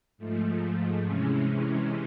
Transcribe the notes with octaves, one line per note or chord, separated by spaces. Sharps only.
G#2 F3 A3
C3 E3 G#3 C#4